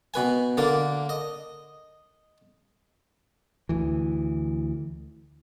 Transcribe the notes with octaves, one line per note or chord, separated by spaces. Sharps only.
B2 B4 G#5
D3 A#3 D4
D#5
D2 E3